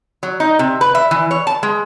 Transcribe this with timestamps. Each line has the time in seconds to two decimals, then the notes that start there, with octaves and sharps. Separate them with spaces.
0.23 F#3
0.40 D#4
0.59 C3
0.81 B4
0.95 E5
1.11 E3
1.31 C#5
1.47 A5
1.63 G#3